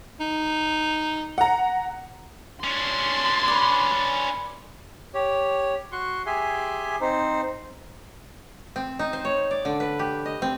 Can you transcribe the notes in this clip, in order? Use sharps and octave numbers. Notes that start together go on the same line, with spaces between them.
D#4
F#5 A#5
C#4 D4 C6
B4 D5
G4 C#5
F#4 C6 C#6
G4 G#4 E5 G#5 C6
C4 D#4 C5
C4
D#4
C5
C#5
D5
D3
B4
G4
D#5
C4